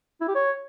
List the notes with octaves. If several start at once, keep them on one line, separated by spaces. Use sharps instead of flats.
E4
G4
C#5